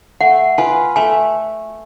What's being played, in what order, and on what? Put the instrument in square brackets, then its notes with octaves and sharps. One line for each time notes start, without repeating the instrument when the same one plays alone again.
[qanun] A3 [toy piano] F#5
[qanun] F4 B4 [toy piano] G#5
[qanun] A3 [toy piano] G#5